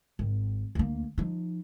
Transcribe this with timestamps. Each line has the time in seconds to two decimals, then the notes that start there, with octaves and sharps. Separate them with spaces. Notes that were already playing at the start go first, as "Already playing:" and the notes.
0.19 G#1
0.75 D2 A#3
1.18 F3 D#4